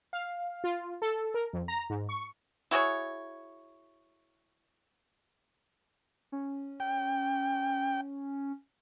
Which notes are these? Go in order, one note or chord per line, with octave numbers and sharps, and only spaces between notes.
F5
F4
A4
A#4
F2
A#5
G#2
C#6
E4 F#4 G#4 C#5
C#4
G5